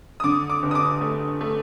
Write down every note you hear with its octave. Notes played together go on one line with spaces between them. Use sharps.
D#6
D3 D6
D6
G1
D#6
D6
A3
A3